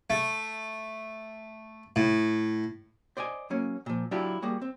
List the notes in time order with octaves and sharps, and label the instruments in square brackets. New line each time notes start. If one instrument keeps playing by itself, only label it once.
[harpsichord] A3
A2
[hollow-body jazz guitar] C5 D5 D#5 F5 G#5
F#3 A#3 C#4
A#2 F3
F#3 D4 E4 F4 G4 D5
G3 A#3 F#4 G#4
C4